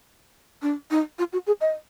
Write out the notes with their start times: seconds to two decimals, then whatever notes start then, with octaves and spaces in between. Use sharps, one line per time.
0.62 D4
0.91 D#4
1.19 F4
1.33 F#4
1.47 G#4
1.61 D#5